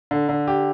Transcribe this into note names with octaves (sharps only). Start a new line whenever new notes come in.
D3
D3
G4